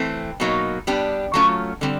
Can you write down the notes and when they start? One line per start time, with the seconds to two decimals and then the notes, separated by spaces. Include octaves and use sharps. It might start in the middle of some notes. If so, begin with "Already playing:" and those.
Already playing: E3 A3 C4
0.40 B2 F#3 A#3 D#4
0.87 G3 B3 D4 G4
1.34 F#3 A3 C#4 F4
1.81 D3 G3 C4